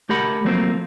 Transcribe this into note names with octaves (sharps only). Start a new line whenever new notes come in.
A3 G4 A#4 F#5 B5
F3 F#3 A3 A#3 C4 C5